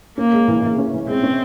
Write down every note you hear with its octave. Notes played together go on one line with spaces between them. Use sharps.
A#3 C#4
G#3
E3
E3
C#4
E3
G#3 C4
C#4